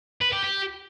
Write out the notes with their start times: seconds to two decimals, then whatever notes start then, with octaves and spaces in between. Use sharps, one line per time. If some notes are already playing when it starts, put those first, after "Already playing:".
0.21 B4
0.32 G4
0.44 G4